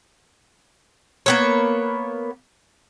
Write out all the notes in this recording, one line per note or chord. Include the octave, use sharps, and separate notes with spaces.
A#3 B3 C#5